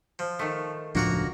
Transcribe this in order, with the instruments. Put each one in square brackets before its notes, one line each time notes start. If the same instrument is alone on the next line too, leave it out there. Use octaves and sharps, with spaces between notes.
[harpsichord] F3
[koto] D#3 A3
[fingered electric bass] E1 C#2 D4 [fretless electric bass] A2 F3 [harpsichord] A#3 F#4 A#5